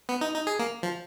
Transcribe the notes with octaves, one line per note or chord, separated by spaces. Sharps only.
B3
D#4
D#4
G#4
A#3
F3